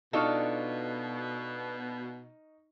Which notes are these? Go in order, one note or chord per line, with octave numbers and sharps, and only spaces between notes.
B2 D4 D#4 F4 A4 C#6 F6